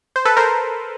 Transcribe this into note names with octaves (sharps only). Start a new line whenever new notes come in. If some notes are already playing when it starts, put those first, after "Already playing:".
C5
A4 B4
A#4 C5